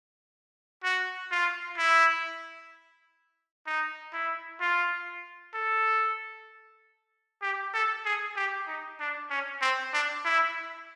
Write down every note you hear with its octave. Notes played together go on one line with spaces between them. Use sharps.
F#4
F4
E4
D#4
E4
F4
A4
G4
A4
G#4
G4
D#4
D4
C#4
C4
D4
E4